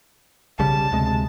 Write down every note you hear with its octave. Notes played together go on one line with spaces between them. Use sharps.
B1 C#3 G3 A5
D2 C3 G#3